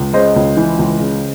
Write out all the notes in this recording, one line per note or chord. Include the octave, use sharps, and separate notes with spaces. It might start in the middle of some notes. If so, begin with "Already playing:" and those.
Already playing: C#2
C#3 C5 D#5
C#2
E3
C#2
C#3